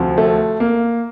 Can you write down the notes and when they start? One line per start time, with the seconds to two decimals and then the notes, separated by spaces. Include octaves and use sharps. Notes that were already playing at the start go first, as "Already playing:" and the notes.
Already playing: D2 C3 F3
0.18 A3
0.60 A#3